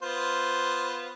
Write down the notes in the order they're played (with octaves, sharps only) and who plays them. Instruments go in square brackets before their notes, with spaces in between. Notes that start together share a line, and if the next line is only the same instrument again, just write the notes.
[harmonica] B3 F4 C5